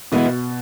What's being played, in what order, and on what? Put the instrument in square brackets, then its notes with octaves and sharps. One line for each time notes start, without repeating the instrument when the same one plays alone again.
[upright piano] B2 [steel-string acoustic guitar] E3 G#3 B3 E4